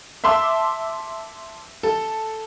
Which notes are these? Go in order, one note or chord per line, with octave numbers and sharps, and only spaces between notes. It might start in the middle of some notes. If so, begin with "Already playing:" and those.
E5 A5 C6 D6 E6
A4